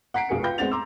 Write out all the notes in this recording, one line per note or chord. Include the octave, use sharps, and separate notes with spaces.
F#5 A#5 B6 C7 D7
F1 B1 F#4 G#4 A#4 C#7
F4 B4 G5 B5 G6 A#6
G#3 B3 C4 F#5 A6 F7
A#5 C6 D6 E6